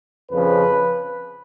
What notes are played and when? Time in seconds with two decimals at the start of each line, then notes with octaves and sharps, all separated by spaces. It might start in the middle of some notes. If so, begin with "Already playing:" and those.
0.31 F2 C#3 F3 B4